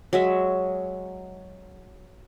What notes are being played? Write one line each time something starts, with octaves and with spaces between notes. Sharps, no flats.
F#3 G#3 E5